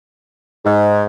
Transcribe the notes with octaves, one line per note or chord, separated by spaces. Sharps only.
G#2